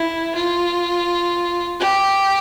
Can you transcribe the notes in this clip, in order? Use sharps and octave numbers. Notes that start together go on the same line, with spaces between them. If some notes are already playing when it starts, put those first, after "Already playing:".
Already playing: E4
F4
G4